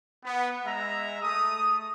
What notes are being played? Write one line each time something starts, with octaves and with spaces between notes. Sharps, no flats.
B3
G#3 E5 A#5
A3 D#6